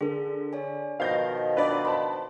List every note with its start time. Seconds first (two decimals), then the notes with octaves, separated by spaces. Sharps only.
0.01 D3 G#4 A#4
0.53 C#5 D5 G#5
1.00 B2 D#3 F3 C5 F5 G6 A#6
1.57 D4 B4 D5 D#5
1.85 C5 A5 B5 C6